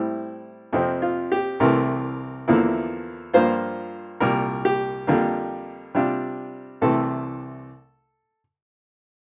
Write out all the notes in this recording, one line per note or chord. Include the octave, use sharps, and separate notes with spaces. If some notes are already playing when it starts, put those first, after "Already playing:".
Already playing: A2 G3 C4 E4
F2 C3 F3 C4
F4
G4
C2 C3 E3 A3 A#4
E2 D3 F3 A#3 E4
G2 F3 A#3 F4 C5
C2 A#2 G3 A#3 A#4
G4
F2 D3 G3 A#3 F4
C3 G3 D4 F4
C2 C3 E3 A3 A4